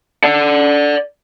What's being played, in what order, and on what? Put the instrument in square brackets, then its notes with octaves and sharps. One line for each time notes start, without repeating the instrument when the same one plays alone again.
[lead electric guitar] D5 F#5